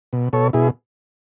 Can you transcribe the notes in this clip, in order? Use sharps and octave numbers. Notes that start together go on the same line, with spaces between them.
B2
B2 A4 C#5
B2 E4 G#4